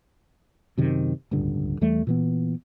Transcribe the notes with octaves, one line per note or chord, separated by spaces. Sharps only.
F#2 C3 D#3
D1 C#2 G2 D3
E2 E3 G3 A3
A#2 E3 B3